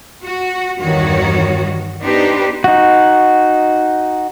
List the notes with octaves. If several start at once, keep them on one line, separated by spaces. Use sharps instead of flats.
F#4
E2 G2 D#3 F#4 C#5
B3 D4 D#4 G4 B4 C5
D#4 F#4